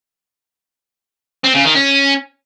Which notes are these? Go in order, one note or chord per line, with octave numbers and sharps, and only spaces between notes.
C4
C#3
D#3
C#4